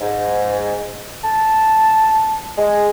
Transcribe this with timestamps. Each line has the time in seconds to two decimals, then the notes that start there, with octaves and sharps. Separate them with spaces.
0.01 G#2
1.24 A5
2.58 G#3